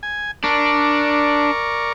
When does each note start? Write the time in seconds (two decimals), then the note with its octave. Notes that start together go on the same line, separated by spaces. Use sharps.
0.03 G#5
0.44 D4 A#4 D5 C#6